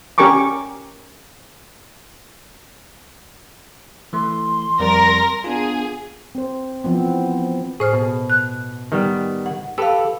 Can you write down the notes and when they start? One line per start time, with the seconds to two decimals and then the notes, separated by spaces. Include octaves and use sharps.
0.18 C#4 G4 A#4 G#5 C#6 D6
4.13 E3 A3 C6
4.79 F2 G3 A#4 D5 A#6
5.44 B3 D4 F4 G#4
6.35 C4 C5
6.84 E3 F3 B3 C4
7.80 A2 G#4 C5 F6
7.93 B2
8.30 F#6
8.92 D#3 G3 B3
9.46 F#5
9.78 G4 A4 B4 F5 E6